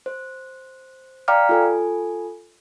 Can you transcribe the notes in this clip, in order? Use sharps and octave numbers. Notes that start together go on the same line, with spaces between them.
C5
D5 F5 G5 A#5 D6 F6
F4 A4 G#5